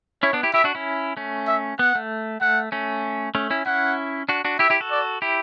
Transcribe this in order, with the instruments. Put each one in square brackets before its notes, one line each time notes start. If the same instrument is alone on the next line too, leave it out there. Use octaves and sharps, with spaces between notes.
[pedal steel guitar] C#4 E4 [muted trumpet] C#5
[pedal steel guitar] B3 D4
E4 G4
[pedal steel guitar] E4 G4 [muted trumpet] E5
[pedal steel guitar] D4 F#4
C#4 E4
A3 C#4
[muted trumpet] E5
[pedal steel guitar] B3 [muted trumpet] F#5
[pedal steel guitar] A3
[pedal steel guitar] A3 [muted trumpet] F#5
[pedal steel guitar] A3 C#4
A3 C#4
C#4 E4
[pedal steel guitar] C#4 E4 [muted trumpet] F#5
[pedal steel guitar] D4 F#4
D4 F#4
[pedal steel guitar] E4 G4 [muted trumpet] E5
[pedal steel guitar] E4 G4
F#4 A4
[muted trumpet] D5
[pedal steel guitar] E4 G4